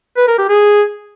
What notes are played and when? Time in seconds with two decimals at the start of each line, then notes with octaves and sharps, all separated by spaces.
0.17 B4
0.28 A#4
0.38 G4
0.49 G#4